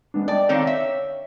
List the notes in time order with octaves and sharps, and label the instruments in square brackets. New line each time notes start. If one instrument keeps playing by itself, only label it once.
[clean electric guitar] G#3 B3 D4
[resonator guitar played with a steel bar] D5 [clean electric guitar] D#5 G5 A5
[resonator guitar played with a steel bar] D3 D#3 C4 [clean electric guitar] C#5 F5
[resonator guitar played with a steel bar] E5